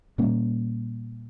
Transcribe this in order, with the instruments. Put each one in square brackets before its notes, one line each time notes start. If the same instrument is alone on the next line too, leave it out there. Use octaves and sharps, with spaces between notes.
[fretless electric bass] A#2 G3 A#3 C#4